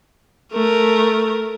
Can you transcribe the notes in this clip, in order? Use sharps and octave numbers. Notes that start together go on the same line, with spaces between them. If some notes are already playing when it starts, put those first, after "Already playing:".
A3 A#4